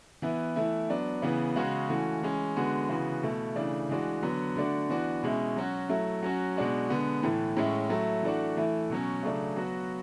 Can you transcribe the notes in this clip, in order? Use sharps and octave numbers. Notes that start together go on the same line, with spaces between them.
E3 B3 E4
E3 A3 E4
F#3 B3 D4
C#3 E3 B3
C#3 G#3 C#4 F#4
E3 A3 C#4 F#4
E3 G#3 C#4
D3 G#3 B3 F#4
C#3 E3 B3 F#4
B2 A3 E4
C#3 E3 A3 D4
E3 G#3 D4 F#4
D3 F#3 B3
D3 A3 D4 F#4
E3 B3 D4 F#4
B2 G#3 C#4 E4
F#3 C#4 F#4
F#3 A3 E4
F#3 C#4 F#4
B2 G#3 D4 F#4
D3 G#3 B3
A2 E3 A3
A2 G#3 C#4 E4
F#3 A3 E4
E3 A3 D4 F#4
E3 A3 E4
B2 F#3 C#4
C#3 F#3 A3 D4
F#3 B3 F#4